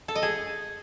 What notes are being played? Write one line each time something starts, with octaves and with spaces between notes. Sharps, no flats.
A4
D#5
G#4